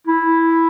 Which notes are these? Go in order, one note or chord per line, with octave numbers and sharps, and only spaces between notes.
E4